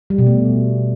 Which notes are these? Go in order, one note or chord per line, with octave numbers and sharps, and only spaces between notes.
G3
B2
A3